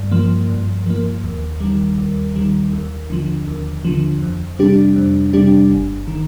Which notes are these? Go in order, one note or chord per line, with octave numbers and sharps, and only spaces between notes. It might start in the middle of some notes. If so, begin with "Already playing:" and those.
Already playing: G2
F3 A#3
G2
F3 A#3
D#2
D#3 G3
D#2
D#3 G3
D#2
D3 F3
D#2
D3 F3
F2
C3 G3 D4 G4
F2
C3 G3 D4 G4
G1
D#3